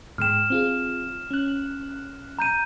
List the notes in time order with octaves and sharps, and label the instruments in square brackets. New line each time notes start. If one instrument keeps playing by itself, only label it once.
[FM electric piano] G#2 G#3 G5 [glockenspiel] F6 E7
[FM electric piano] C4 F4 G#4
C#4 F#6
[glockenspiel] A#5 G6 D#7